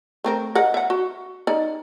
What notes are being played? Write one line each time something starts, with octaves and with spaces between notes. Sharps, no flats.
A3 C4 A#4
A#4 D#5 F#5
E5 F#5
F#4
D#4 D5